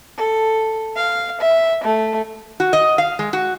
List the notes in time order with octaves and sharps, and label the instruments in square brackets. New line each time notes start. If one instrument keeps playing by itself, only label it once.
[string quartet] A4
F5
E5
A3
[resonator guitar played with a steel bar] F#4
D#5
F5
G#3
F#4